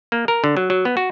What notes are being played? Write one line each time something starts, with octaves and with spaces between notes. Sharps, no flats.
A#3
A#4
D3
F#3
F#3
B3
F#4